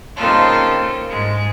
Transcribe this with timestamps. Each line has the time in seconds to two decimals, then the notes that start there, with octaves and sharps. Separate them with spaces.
0.15 C#3 A#3 C4 D#4 F4 A4
1.10 G#2 G#3